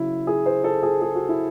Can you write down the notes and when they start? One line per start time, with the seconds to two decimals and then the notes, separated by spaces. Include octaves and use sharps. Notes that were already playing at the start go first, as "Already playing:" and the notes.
Already playing: C#3 F#3 E4
0.27 G#4
0.46 C5
0.64 A4
0.83 G#4
1.02 G#4
1.15 F#4
1.29 E4